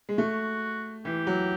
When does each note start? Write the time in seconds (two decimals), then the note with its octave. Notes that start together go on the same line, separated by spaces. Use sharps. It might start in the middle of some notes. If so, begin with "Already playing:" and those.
0.09 G#3
0.18 A3 F#4
1.05 E3 G4
1.27 F#3